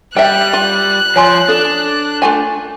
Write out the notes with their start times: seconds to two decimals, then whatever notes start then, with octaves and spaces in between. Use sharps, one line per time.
0.17 G3 E5 G5 F#6
0.53 F4
1.16 F3 C#5 G#5 C6
1.49 D4 A4
2.22 A3 F4 G#5